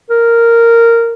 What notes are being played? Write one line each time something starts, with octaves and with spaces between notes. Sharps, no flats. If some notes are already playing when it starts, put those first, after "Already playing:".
A#4